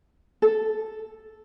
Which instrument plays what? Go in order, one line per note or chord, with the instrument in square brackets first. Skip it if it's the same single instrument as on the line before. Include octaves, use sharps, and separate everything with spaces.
[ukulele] A4